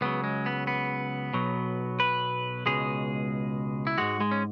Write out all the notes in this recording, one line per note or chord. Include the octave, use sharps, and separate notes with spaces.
C#2 C#3 F#3 B3
G#3
B3
B3
B1 B2 F#3
B4
C#2 B2 G#3 G#4
E4
G#2 G#3 F#4
G#3
C#4